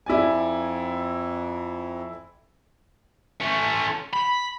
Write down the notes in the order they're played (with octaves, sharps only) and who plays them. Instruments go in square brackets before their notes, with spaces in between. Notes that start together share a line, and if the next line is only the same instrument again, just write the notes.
[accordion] F2 [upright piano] E4 D5 G#5
[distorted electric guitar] A3 C#4
B5